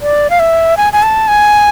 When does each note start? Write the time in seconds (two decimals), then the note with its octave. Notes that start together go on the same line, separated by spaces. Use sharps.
0.02 D5
0.30 F5
0.39 E5
0.77 G#5
0.93 G#5
1.03 A5
1.28 G#5